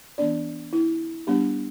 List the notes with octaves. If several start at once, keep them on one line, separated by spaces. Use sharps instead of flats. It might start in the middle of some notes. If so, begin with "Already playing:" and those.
E3 B3 D4 D5
E4
G3 B3 D4 G4